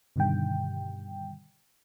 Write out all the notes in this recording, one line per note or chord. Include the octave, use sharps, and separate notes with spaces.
G2 B2 D3 D#3 G3 G5